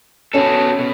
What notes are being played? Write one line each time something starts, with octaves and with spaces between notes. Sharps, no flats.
B3 C#4 F#4 A4
B2